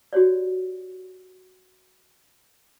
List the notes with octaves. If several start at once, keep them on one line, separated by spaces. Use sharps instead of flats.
F#4 G4 C#5 D5